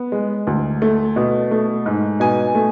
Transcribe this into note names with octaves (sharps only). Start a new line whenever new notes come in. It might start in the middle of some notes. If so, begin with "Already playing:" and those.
Already playing: B3
G#3
D2
A3
B2
A3
G#2
B2 G#5
A3